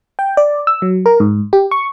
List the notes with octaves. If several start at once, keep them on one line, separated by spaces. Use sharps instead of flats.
G5
D5
E6
F#3
A#4
G#2
G4
C#6